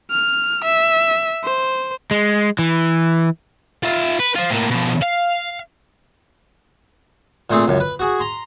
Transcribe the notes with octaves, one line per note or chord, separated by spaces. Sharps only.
F6
E5
C5
G#3
E3
F4 E5
B4
F4 C5
A2 A#3
B2 F3
F5
A#2 A3 C4 G#4
C#2 F#2
B4
F#4 G#4
A#5 C6